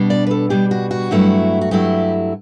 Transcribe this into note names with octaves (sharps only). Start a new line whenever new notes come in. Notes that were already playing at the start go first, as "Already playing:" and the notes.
Already playing: B2 G3 D4
D5
B4
A4
B2 G3 D4 G4
F#4
F#4
G2 F#3 A3 E4
F#4
G2 F#3 A3 E4 G4